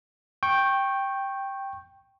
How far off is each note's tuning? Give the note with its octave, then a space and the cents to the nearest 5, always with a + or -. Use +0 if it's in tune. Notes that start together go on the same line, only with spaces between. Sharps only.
G5 +0 C#6 -20